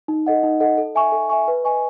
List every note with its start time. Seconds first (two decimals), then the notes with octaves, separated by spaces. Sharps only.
0.08 D#4
0.26 A4 D#5 F#5
0.43 D#4
0.60 A4 D#5 F#5
0.78 A4
0.95 E5 G#5 C#6
1.12 A4
1.30 E5 G#5 C#6
1.48 B4
1.64 D#5 G#5 C#6